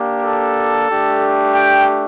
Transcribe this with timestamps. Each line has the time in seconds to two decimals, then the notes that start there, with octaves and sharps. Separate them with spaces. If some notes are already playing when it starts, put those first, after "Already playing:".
Already playing: A#3 D4 G4
0.23 A4
0.89 A3 D4 G4
1.55 G5